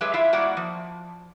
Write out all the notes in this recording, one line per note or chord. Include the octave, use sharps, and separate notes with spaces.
F#3 G#3 G4 G#4 B4 E5
E4 F4 E5 F5
G3 A#3 E4 F#4 D5 F#5
F3